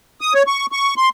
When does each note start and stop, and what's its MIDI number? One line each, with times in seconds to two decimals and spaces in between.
0.21 0.33 87
0.34 0.43 73
0.47 0.66 85
0.72 0.94 85
0.97 1.09 84